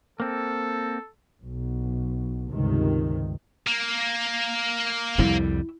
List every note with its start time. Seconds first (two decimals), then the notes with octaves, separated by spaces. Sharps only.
0.20 A#3 C4 A4
1.43 B1
2.49 C#2 G2 C3 D#3
3.67 A#3
5.18 C2 F2 G3 E4